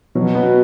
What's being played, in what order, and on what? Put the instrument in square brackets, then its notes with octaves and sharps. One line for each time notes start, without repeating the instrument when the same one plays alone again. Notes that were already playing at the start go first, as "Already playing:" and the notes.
[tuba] B2 [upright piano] F#3
[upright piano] B3